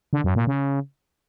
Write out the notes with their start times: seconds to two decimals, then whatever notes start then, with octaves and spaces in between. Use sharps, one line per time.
0.13 D3
0.24 F#2
0.36 A#2
0.47 C#3